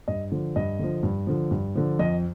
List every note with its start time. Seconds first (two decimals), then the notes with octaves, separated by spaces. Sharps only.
0.08 G2 D#5
0.32 D3 F3
0.56 G2 D#5
0.79 D3 F3
1.03 G2
1.27 D3 F3
1.51 G2
1.75 D3 F3
1.99 F2 D#5